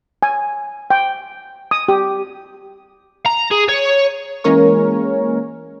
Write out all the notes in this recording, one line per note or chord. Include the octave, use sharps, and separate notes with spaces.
G#5
G5
D#6
G4
A#5
G#4
C#5
E3 G#3 A#3 C#4 A#4 C#5